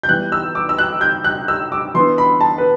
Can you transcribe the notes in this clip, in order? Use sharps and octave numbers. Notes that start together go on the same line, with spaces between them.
G6
E3 G3 B3 F#6
E6
D6
E6
F#6
G6
F#6
E6
D6
E3 B3 D4 C6
B5
A5
B4